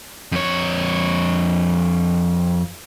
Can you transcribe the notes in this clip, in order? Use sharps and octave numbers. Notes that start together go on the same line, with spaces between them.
F2 C#5